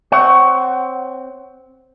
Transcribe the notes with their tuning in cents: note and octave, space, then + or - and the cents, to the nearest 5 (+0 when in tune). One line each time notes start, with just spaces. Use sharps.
C4 +0 C#5 +0 F#5 +30